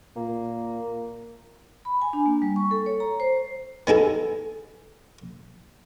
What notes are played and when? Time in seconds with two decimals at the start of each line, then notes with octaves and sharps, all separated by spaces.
0.16 A#2 A#3
1.85 B5
2.02 G#5
2.13 D4
2.26 A#3
2.42 G3
2.56 C#6
2.71 A4
2.86 C#5
3.00 A#5
3.20 C5
3.87 B3 D#4 G#4 A4